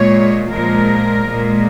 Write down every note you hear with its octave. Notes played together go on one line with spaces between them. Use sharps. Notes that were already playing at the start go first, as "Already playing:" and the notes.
Already playing: A#2 G#3 C#5
A#2 F3 G#3 A#4
A#2 G#3